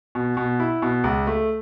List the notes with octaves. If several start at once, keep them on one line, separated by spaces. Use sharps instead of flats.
B2
B2
E4
B2
C#2
A3